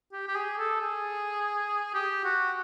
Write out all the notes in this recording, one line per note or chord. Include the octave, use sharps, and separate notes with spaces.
G4
G4
G#4
A4
G#4
G4
F#4